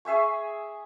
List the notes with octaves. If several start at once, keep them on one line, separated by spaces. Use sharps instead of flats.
G#4 E5 G#5 C#6